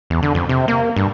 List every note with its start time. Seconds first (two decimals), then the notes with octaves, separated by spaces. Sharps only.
0.10 E2
0.22 D3
0.35 F2
0.49 C3
0.68 A#3
0.96 G2